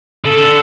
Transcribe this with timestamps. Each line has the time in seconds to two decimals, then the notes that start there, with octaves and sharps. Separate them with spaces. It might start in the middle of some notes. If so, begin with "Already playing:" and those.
0.25 C#3 A4
0.40 D3